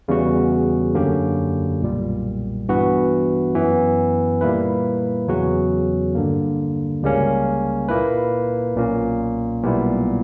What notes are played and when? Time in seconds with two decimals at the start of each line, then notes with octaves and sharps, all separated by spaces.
0.08 E2 C#3 G3 B3 F#4
0.94 F#2 D3 A#3 C#4 G4
1.82 B1 A#2 G3
2.68 G2 E3 B3 F#4 B4
3.55 F#2 E3 B3
4.41 A#2 G3 A#3 E4 B4
5.28 E2 C#3 F#3 C#4 F#4
6.15 G2 D3 A#3
7.02 C#2 C#3 G3 A#3 C#4
7.88 A#2 A#3 E4 B4
8.75 B1 A#2 A#3 C#4
9.62 B1 A#2 G3 B3 E4